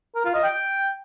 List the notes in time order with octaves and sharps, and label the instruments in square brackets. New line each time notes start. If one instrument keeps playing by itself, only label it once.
[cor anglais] A#4
F4
D#5
G5